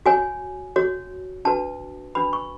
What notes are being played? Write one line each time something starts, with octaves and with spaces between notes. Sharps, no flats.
F#4 C#5 G#5
F#4 C#5
D4 F#4 B4 A5
D4 F#4 B4 B5
C#6